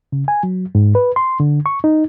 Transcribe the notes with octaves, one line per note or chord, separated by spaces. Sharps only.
C#3
G#5
F#3
G#2
B4
C6
D3
C#6
D#4